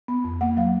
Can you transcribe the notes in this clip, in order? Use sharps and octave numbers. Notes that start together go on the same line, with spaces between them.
B3
F2
A#3 F#5
F#3 F5